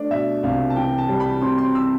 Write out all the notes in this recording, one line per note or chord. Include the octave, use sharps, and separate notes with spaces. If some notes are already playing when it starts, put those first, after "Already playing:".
Already playing: A3 D4 D5
B2 E5
C2 F5
A5
E3 G5
A5
G3
B5
C3 C6
C6
E6